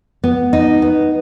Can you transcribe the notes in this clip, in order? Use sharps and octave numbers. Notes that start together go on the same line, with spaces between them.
B3
D#4
B3